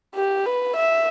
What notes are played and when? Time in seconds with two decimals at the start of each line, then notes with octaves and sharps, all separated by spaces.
0.15 G4
0.46 B4
0.76 E5